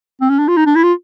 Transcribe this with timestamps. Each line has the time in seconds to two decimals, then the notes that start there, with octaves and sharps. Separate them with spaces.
0.21 C4
0.30 C#4
0.39 D4
0.48 F4
0.57 D#4
0.66 D4
0.75 E4
0.83 F4